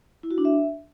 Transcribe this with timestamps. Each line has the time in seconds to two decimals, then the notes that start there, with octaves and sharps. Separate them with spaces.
0.23 E4
0.31 F#4
0.38 D4
0.45 E5